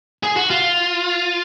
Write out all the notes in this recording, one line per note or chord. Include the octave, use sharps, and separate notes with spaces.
G#4
F#4
F4